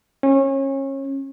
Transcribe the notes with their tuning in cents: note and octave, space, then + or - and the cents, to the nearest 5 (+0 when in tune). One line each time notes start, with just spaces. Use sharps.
C#4 -30